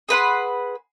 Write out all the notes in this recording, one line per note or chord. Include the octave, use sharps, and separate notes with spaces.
G#4 B4 F#5 C6